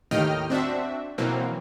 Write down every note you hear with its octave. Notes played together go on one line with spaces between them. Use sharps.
D#2 A2 D#3 D#5 G5 F6
C4 D4 F#4 E5
B2 E3 F#3 A#3 C4